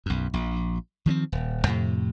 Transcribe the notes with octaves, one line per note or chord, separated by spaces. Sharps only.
B1 F#2
A#1
D#3 F3 B3 C4
D#1
F2 A2 C3